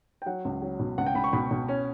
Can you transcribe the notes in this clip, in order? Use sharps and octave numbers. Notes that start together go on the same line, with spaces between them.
G5
F#3 F#5
C#2
F#3
B2
C#2 F#5
G5
C#2 B5
C#6
B2 B5
B2
C#4